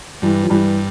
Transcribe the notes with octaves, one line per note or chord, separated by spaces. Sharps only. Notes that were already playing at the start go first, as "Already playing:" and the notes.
G2 E3 G3
F3
G2 E3 G3